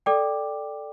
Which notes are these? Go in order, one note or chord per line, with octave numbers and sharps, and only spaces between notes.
A4 D5 G5 D6